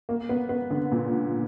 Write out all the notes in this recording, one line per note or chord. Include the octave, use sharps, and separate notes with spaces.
A#3
B3
B3
D3
A#2